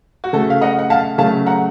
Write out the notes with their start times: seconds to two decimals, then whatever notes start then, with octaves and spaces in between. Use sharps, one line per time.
0.24 F#4
0.33 C#3 A3 A4
0.50 F5
0.61 D#5 F#5
0.79 F#5
0.90 F5 A5
1.18 C#3 F#3 A3 F5 A5
1.46 F#5 A#5